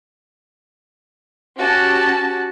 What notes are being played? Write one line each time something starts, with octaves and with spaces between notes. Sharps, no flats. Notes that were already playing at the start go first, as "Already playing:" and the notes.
C#4 F#4 G4 A5